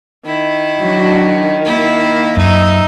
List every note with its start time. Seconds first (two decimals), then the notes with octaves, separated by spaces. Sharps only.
0.26 D#3 E4
0.79 F#3 D4 F#4
1.65 A#3 E4
2.37 F#2 D#4 E5